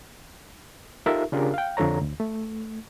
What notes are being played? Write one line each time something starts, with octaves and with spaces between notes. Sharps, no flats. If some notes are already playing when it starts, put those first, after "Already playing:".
D#4 F4 G4 A4 A#4 E5
C#3 D4 F4 G4 G#4 A#4
F5 G5
F2 D3 F3 A4 C#5 A#5
D2
A3